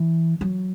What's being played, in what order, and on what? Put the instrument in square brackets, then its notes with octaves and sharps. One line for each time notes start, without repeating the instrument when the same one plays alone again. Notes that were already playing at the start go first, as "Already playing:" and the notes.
Already playing: [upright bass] E3
F#3